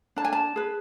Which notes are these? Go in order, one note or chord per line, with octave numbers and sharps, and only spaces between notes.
D4 A5
G#5
A5
G#4 B4